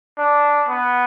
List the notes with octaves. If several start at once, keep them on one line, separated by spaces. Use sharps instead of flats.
D4
B3